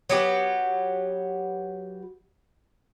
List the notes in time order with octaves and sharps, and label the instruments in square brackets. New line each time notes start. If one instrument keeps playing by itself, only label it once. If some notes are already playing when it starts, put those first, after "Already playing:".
[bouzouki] F#3 B3 G4